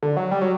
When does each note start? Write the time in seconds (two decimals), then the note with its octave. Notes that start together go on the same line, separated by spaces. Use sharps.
0.02 D3
0.17 F#3
0.31 G3
0.41 F#3